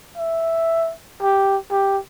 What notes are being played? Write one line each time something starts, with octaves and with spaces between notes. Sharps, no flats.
E5
G4
G4